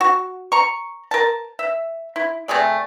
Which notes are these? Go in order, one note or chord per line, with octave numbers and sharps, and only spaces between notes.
F#4
A#5 C#6
A#4 A5
E5
E4
C3 A3 G#4 D5